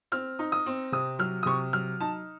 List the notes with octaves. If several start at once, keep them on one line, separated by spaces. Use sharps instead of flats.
C4 F6
D#4
D#6
C4
C3 D#6
F#3 F6
D#6
C3 C#6
F#3 F6
D#4 A5